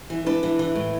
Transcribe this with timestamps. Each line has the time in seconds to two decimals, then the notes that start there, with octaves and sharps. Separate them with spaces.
0.10 E3
0.26 D4 B4
0.43 E3
0.59 E3
0.75 A2